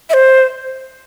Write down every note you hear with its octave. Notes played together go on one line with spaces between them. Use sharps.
E5
C5